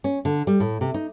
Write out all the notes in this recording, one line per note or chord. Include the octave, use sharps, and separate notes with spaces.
C#4
D3
G3
A2
C3
D#4